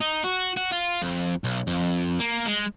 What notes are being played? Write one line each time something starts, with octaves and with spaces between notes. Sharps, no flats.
D#4
F#4
F#4
F4
F2
B1
F2
A#3
G#3